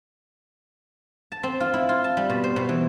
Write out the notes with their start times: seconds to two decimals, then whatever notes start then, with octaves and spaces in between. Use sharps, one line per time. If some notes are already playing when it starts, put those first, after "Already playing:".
1.32 A5
1.43 C4
1.60 F4
1.74 E4
1.89 F4
2.04 A5
2.17 G3
2.30 B2
2.44 C5
2.56 B2
2.69 E3